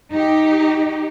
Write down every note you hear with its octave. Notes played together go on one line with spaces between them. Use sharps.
D#4 G4